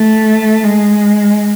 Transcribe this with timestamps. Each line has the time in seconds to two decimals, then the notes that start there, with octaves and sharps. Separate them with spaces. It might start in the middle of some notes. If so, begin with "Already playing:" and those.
Already playing: A3
0.64 G#3